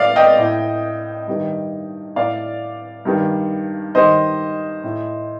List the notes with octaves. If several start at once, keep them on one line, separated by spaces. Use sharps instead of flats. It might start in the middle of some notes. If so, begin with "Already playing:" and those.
Already playing: A2 D5 F5
D#5 G5
A2
G2 D#3
A2 D5 F5
G2 D#3
G2 D#3 C5 D#5
A2